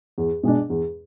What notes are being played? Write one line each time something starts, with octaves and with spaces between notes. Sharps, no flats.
E2
B2 G#3 D4
E2